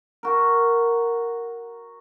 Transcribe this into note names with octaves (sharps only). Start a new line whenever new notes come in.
F#4 A#4